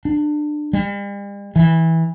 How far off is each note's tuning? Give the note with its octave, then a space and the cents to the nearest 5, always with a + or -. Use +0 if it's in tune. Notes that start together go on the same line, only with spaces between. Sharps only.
D4 +25
G3 +45
E3 -15